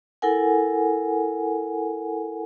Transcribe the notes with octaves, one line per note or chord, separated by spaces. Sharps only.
E4 A4 A#4 F#5 G#5